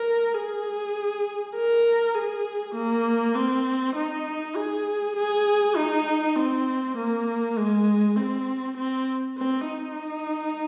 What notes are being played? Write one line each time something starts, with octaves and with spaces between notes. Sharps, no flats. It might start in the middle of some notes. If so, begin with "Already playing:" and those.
Already playing: A#4
G#4
A#4
G#4
A#3
C4
D#4
G#4
G#4
D#4
C4
A#3
G#3
C4
C4
C4
D#4